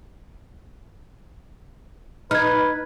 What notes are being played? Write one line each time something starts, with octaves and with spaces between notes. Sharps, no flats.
D#4 B4 F6 G#6